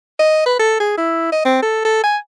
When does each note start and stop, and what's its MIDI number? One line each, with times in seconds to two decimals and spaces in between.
0.19 0.42 75
0.46 0.56 71
0.59 0.77 69
0.80 0.93 68
0.98 1.28 64
1.32 1.41 75
1.45 1.60 60
1.62 1.80 69
1.85 2.02 69
2.04 2.17 80